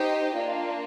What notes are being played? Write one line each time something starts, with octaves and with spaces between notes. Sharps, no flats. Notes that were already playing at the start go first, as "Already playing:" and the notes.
Already playing: D#4 G4 C5 D#5 G5
A#3 D4 F4